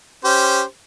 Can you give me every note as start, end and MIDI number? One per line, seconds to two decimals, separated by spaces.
0.24 0.63 61
0.24 0.63 67
0.24 0.63 72